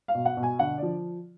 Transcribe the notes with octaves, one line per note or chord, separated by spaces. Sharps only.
F5
B2
F#5
B2
G#5
D3 F#5
F3 D5